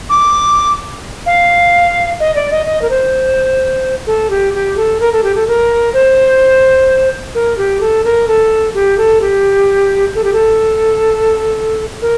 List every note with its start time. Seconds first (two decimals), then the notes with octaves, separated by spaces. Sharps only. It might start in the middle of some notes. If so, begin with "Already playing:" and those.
0.10 D6
1.26 F5
2.20 D#5
2.35 D5
2.51 D#5
2.66 D#5
2.82 A#4
2.90 C5
4.07 A4
4.30 G4
4.54 G4
4.77 A4
5.00 A#4
5.12 A4
5.23 G4
5.35 A4
5.48 A#4
5.93 C5
7.35 A#4
7.58 G4
7.81 A4
8.05 A#4
8.28 A4
8.75 G4
8.98 A4
9.21 G4
10.15 A4
10.24 G4
10.33 A4
12.02 A#4